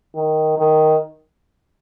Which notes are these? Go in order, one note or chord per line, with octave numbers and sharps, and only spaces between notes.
D#3
D#3